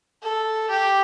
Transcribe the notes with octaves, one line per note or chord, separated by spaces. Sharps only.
A4
G4